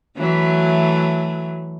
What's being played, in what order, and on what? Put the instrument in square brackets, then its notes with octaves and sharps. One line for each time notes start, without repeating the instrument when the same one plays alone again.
[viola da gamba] E3 F#3 A3